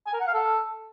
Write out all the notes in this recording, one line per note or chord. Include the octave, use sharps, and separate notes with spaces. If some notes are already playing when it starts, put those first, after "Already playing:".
G#5
A#4
F#5
F5
A4